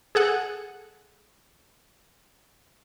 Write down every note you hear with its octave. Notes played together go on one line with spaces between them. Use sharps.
G#4 A4 F#5 G#5